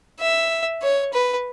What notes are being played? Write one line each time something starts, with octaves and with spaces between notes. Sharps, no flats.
E5
C#5
B4